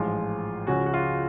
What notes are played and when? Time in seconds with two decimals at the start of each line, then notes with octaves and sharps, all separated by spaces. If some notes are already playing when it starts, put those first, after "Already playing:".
Already playing: A1 G#2 F3 G#3 F4
0.67 C#2 C#3 F3 G#3 C#4 F#4
0.86 F#4
0.94 F4